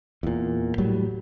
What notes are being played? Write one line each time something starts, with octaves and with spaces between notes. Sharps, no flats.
E2 A#2
A2 F#3 G3